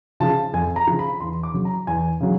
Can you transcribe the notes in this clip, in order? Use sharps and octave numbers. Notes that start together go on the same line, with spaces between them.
C#3 F3 A5
F2 G#5
A#5
C#3 F3
B5
E2 C6
D6
C#3 F#3
A#5
E2 G#5
C#3 F#3